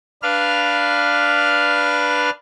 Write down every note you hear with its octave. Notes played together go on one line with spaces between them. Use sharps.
D4 B4 F5 F6